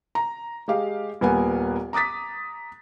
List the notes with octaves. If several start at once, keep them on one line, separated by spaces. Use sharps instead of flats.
A#5
G#3 G4 F5
D#1 A#3 B3 A#4 F#5 G#5
A#5 D6 D#6 A6 B6